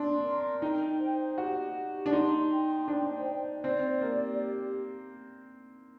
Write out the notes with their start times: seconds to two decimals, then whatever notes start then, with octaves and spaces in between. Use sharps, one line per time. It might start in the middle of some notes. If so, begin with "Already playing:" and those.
Already playing: C4 D4 C6
0.24 A#4
0.62 D#4 G5
0.99 C5
1.37 F#4 G4
1.75 G4
2.06 D4
2.13 D#4 C6
2.51 G5
2.88 D4 C5
3.26 C5
3.64 C4 D5
4.01 A#3 G4